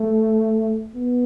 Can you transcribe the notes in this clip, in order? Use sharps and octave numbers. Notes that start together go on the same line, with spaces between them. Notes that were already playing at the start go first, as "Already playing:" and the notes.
Already playing: A3
B3